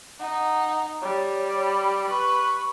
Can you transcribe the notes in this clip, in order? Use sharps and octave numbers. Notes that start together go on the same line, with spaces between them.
D#4 F#5
G3 C#5
B5
B4 C#6